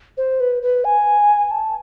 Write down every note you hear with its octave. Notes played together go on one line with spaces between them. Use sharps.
C5
B4
B4
G#5
A5